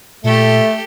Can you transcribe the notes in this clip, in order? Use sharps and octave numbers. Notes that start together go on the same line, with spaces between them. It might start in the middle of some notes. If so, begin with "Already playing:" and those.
A#2 A3 G4 A4